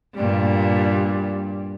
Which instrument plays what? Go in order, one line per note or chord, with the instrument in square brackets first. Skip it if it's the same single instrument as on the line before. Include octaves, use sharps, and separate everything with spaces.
[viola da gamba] G2 A#2 G3